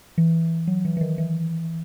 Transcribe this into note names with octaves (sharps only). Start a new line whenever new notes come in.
E3
F#3
E3
E3
D#3
E3